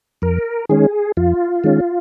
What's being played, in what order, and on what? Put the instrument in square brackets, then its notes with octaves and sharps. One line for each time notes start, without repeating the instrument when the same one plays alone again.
[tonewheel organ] F2 A#4
D#3 G#3 C#4 G#4
F2 F4
D#3 G#3 C#4